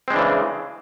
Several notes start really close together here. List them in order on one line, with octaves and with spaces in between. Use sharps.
C4 G#3 D4 E3 C#3